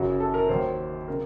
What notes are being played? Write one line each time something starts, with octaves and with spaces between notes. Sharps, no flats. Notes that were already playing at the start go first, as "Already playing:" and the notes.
Already playing: F#1 F#2 C#3 F#3 F#4
A4
A#4
D#2 D#3 F#3 C5
C#3 A#4